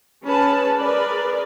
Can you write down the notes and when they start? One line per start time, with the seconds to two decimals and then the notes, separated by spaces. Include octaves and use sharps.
0.23 C#4 G#4 B4 A5
0.76 G#4 A#4 B4 D5